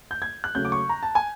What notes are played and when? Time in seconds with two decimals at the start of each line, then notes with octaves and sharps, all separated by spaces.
0.11 G6
0.22 G#6
0.44 F#6
0.55 C#3 F#3 A3 C#4 G6
0.65 D6
0.72 C#6
0.89 A#5
1.03 A5
1.15 G#5